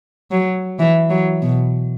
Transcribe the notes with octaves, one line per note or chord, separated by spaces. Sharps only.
F#3
E3
F#3
B2